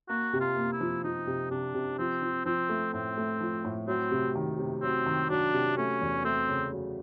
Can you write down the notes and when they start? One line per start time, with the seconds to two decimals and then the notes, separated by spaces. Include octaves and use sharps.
0.09 A#3 F#4
0.33 C3
0.41 F4
0.56 A#3
0.73 E4
0.80 F3
1.04 F3 D#4
1.27 C3
1.51 C3 D4
1.74 C3
1.98 F3 C4
2.22 F3
2.46 F3 C4
2.69 A3
2.93 A2 C4
3.17 A3
3.41 F3
3.65 A2
3.88 F#3 C4
4.11 C3
4.35 D#3
4.58 C3
4.83 F#3 C4
5.06 D#3
5.30 F#3 D4
5.54 C3
5.77 A3 C#4
6.01 E2
6.25 A3 C4
6.49 C#3
6.72 F#3